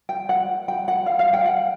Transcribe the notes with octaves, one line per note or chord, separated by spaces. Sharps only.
G5
F#5
G5
F#5
F5
F5
G5
F#5